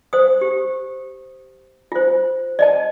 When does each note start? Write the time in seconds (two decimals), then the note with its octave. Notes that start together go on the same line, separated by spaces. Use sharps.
0.13 C5 D#6
0.41 G4
1.92 F4 C5
2.59 D5 D#5 A5